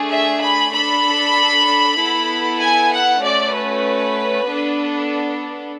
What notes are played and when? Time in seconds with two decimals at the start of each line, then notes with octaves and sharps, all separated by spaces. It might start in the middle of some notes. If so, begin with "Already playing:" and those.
Already playing: A3 D4 G#4
0.11 E5
0.42 B5
0.73 D4 A4 B5
1.98 B3 E4 A4
2.60 G#5
2.91 F#5
3.22 A3 C#4 F#4 D5
3.53 B4
4.47 B3 D4 A4